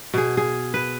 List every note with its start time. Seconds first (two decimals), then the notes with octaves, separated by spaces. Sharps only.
0.14 B2 G#4
0.37 G#4
0.74 B4